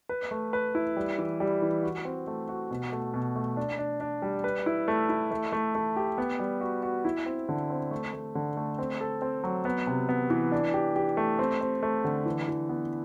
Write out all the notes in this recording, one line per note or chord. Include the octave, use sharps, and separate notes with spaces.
B4
A3
B4
E4
G3
E3
G3
E3
F#4
C4
A3
F#4
B2
A3
B2
A3
D4
D4
D4
G3
B4
E4
A3
E4
A3
A3
A3
G4
B3
G3
F#4
F#4
E4
C4
D3
C4
A3
A3
D3
A3
C4
A4
C4
F#3
B3
C3
B3
E3
D4
G4
G4
A3
C4
C4
A3
D3
E3
E3
B3